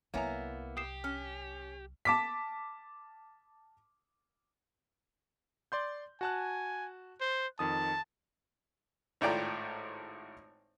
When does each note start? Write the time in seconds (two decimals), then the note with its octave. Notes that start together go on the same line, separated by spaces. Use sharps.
0.14 C2 F#3 A#3 B3 E4 C#5 G#5 A#5
0.77 G4 D#6 C7 E7
1.04 C#4 F6
2.05 A5 D6 B6
5.72 D5 C6 G6
6.21 F#4 G#5 A5 F#6
7.21 C5
7.59 F2 D#3 A5 D#6
9.21 G#1 A2 F4 D5 G5 A#5